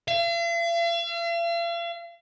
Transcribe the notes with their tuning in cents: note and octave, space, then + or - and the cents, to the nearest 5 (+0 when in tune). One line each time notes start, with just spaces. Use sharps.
F5 -45